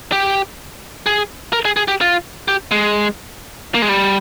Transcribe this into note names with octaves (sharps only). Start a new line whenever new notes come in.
G4
G#4
A#4
G#4
G#4
G4
F4
G4
G#3
A#3
G#3
G3